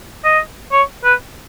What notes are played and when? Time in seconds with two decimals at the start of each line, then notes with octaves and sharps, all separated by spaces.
0.25 D#5
0.72 C#5
1.04 B4